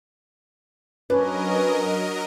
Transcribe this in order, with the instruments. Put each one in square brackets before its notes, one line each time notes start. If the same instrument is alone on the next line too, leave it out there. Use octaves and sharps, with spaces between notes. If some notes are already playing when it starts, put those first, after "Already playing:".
[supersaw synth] F#3 A#4 D#5 [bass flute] C#4 [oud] D4 [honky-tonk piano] B4